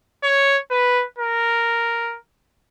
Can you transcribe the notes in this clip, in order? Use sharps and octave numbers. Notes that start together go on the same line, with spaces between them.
C#5
B4
A#4